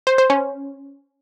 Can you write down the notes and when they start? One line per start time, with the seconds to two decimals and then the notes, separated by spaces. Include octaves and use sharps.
0.07 C5
0.18 C5
0.30 C#4